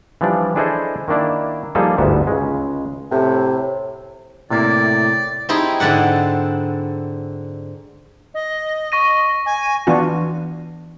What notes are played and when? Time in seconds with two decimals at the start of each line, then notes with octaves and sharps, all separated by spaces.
0.21 E3 F3 G3 D4 D5
0.56 D4 E4 G#4 A4 C5 D#5
1.08 D#3 A#3 D4 E4 D5
1.75 F3 G3 A#3 D#4 G#4 A4
1.98 G1 D2 G#2 B3 E5
2.27 C#2 C#3 G#3
3.11 A2 C3
4.50 A2 C3 A#3 E4 D5
5.49 C4 D#4 E4 G4 G#4
5.80 G#2 D3 D5 F#5
8.34 D#5
8.92 C#6 A#6 D#7
9.46 G#5
9.87 E3 B3 D4 F4 F#4